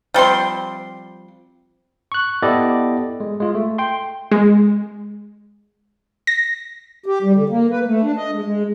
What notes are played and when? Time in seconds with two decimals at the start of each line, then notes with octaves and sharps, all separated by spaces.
0.14 F3 G3 C4 C6
2.12 C#6 F#6
2.42 B3 E4 G4 A4 D5 D#5
3.20 G#3
3.40 G#3 F4
3.55 A3
3.78 G5 C6
4.31 G#3
6.27 A#6
7.06 G4
7.22 G3
7.36 D3
7.49 A#3
7.70 B4
7.86 A3
8.01 D4
8.16 D#5
8.31 G#3
8.43 G#3